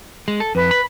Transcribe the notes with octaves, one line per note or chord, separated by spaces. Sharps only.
G#3
A4
F2 B4
B5